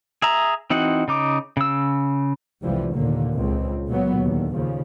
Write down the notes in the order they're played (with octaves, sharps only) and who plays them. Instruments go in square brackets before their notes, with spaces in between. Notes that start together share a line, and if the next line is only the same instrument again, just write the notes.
[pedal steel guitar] G#4 E5 A#5
E3 C4 D#4 F#4 F#5
C#3 D#4 D6
C#3 E6
[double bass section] F1 C2 E3 F3 G3
D#2 A#2 D3 A#3
C#2 C4
A#2 F#3 B3
D#2 D3
D#2 C#3 F3